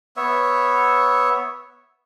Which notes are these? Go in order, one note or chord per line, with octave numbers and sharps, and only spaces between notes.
B3 C#5 E5